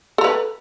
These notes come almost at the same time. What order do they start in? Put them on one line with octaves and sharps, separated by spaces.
A4 A#5 B4